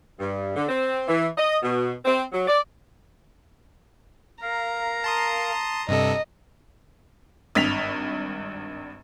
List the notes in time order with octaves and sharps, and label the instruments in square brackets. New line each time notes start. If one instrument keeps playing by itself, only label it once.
[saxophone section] G2
D3
C4
E3
D#5
B2
C4
F#3
D5
[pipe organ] A#4 F5 [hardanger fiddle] A#5
[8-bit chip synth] A5 C6 D#6
[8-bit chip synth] G2 C3 A4 [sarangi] D#5
[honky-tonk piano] G#1 G2 B6 F7